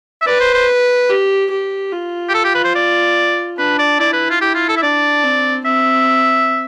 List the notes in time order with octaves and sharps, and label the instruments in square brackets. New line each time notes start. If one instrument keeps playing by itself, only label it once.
[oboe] E5
[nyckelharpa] B4 [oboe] D5
[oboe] C5
C5
[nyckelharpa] G4
G4
F4
[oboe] G4
A4
G4
B4
C5
D5
[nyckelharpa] D4 [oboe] B4
[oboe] D5
[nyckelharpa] E4 [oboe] D5
[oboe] B4
F4
[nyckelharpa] E4 [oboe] G4
[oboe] F4
A4
E5
[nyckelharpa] D4 [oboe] D5
[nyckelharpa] C4
[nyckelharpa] C4 [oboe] E5